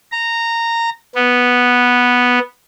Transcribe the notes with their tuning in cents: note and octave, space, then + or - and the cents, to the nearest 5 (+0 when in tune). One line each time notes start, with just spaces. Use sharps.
A#5 -15
B3 -5